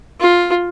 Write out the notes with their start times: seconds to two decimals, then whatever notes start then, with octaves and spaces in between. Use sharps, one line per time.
0.21 F4